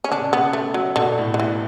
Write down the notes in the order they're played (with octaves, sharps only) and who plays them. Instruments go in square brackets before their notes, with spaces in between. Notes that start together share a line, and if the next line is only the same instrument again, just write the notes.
[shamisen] C#4
[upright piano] C#3 [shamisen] D4
[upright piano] B2
[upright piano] C#3 [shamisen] B3
[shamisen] A3
F#3
[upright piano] B2 [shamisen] D3
[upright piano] A2
[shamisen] D3
E3